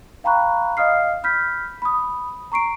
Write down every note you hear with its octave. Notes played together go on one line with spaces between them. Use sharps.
F5 G5 A#5 B5 C#6 F#6
D#5 F5 D#6 F6 C7
B5 F6 G6 B6
B5 D#6
A#5 C#6 C7 D7